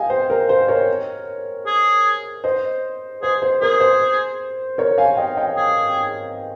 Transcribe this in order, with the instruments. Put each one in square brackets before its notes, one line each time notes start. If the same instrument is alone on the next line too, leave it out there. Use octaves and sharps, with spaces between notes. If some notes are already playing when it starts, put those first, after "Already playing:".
Already playing: [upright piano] D#5 F5 G5 G#5
C5
A#4
C5
A#4 C#5
[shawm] G#4
[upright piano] C5 D#5
[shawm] G#4 [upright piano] C5
[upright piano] C5
[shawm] G#4 [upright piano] A#4
[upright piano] C5
A#4 C#5
F5 G#5
D#5 G5
D#5 G5
[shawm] G#4